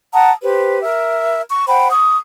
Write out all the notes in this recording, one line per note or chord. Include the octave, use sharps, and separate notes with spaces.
F#5 A5 A#5 D#6
G4 B4 C5
A#4 E5
C#6
C5 F#5 G5 B5
C#6 D#6